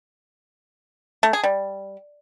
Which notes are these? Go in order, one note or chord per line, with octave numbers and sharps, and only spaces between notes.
A3
G#4
G3